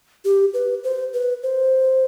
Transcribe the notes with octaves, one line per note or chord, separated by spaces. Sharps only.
G4
B4
C5
B4
C5